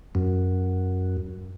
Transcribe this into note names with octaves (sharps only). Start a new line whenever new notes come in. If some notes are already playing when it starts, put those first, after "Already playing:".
F#2